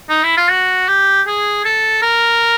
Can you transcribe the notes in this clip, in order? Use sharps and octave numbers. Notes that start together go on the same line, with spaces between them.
D#4
E4
F4
F#4
G4
G#4
A4
A#4